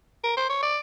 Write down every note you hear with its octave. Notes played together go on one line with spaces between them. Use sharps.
A#4
C5
C#5
D5